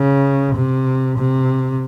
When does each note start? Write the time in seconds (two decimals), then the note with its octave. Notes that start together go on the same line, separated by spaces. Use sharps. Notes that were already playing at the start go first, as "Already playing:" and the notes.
Already playing: C#3
0.55 C3
1.18 C3